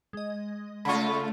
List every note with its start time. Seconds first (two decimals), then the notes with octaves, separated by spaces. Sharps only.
0.13 G#3 D#5
0.85 C#3 A3 F4 B5 C#6